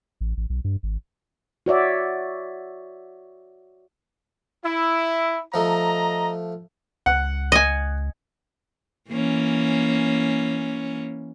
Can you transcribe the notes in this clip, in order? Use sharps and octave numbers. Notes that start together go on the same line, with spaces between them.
A1
A1
B1
G2
G#1
F#4 C#5 D5 E5
E4
F3 A3 D#5 A#5
C#2 F#5
D#5 G#5
E3 A#3 C#4